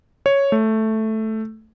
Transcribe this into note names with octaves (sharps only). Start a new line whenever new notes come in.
C#5
A3